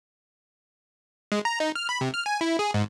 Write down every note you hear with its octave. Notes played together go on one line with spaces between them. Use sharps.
G#3
A#5
D#4
F6
B5
C3
F6
G#5
E4
G#4
G#2